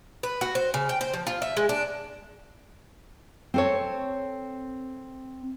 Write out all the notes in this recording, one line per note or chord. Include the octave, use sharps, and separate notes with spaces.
B4
F#4
C5
C#3
G5
C5
F3
F4
E5
G#3
D4
C4 A4 C#5